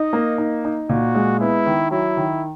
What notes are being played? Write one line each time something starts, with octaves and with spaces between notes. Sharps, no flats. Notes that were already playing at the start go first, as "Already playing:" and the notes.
Already playing: D#4 D#5
A#3
D#4
D#4
A#2 F#4
G#3
B3 E4
D#3
F#3 E4
D#3